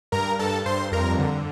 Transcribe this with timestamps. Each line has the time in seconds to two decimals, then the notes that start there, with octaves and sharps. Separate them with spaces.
0.12 G2 A#4 A#5
0.39 G2 A4 A5
0.65 G2 C5 C6
0.92 F2 A#4 A#5
1.19 D3